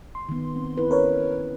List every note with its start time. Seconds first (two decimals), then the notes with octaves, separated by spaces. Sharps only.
0.15 C6
0.29 D#3 B3
0.56 C4
0.77 E4 B4
0.91 C#4 A#4 B4 C#5